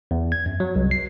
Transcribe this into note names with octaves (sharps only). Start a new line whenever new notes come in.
E2
G#6
F#2
F#3
C2
C7